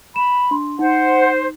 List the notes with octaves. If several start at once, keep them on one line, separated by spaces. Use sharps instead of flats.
B5 E7
D4 C6
D#4 C5 F#5